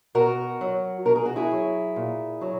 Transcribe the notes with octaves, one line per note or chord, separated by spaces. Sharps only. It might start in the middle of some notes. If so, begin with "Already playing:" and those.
B2 F#4 A#4
F#3
B2 A#4
G#4
F#4
E4 G#4
F#3
A#2
F#3